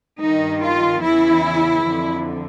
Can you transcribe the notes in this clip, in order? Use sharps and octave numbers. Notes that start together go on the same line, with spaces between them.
G2 D#3 D#4
F4
E2 C#3 E3 E4
F2 D3